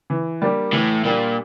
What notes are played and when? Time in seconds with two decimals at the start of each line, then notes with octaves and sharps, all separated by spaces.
0.10 E3
0.42 G3 A#3 D4 G4
0.73 A2 E3
1.05 A#2 G3 A#3 D4 G4